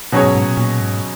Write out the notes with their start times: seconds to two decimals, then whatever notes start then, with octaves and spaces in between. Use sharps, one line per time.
0.12 B2 F#3 C#4 G#4 C#5
0.24 G#2
0.35 G#2
0.46 A#2
0.57 A#2
0.81 G#2